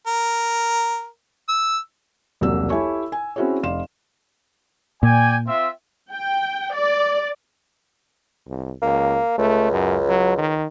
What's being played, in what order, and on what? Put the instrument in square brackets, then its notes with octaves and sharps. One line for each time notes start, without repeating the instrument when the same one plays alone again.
[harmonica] A#4
E6
[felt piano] E1 C2 F#3 A#3 D5 E6
E4 G4 A4 C#5 G#5 C#6
G#5
C4 C#4 E4 F#4 G#4 C#5
F1 D5 F5 C6 E7
[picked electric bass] A#2 [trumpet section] D5 G5 G#5
[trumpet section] C4 F4 E5
[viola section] G5
D5
[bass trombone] C2
[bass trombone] C#2 [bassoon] A#3
[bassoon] C#2 [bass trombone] A3
[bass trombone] F#2
F#3
D#3